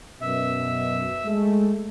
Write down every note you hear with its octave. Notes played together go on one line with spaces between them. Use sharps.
F#2 B2 E5
G#3 A3